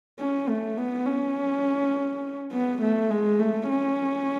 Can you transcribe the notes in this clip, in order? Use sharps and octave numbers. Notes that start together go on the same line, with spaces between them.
C#4
A3
B3
C#4
B3
A3
G#3
A3
C#4